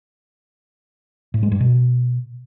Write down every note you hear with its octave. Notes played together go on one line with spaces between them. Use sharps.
A2
G#3
G2
B2